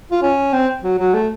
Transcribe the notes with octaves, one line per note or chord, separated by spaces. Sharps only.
F4
C#4
C4
F#3
F#3
A3